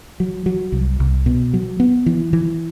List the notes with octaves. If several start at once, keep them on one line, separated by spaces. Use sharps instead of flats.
F#3
F#3
C2
C2
B2
F#3
B3
E3
E3